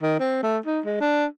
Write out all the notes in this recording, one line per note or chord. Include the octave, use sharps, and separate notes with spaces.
D#3
C4
A3
D#4
G#3
D4